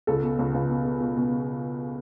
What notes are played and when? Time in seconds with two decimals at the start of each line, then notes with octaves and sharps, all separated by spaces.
0.07 C#2 A4
0.23 B2
0.39 C#2
0.54 C#2
0.69 B2
0.85 B2
1.00 B2
1.17 B2